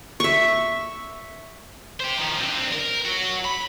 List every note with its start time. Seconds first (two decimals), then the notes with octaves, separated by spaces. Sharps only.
0.20 E5 C#6
2.00 G4 C5
2.18 D#3 F3
2.39 D3 C4
2.72 A#4
3.05 F#3 F#4
3.45 B5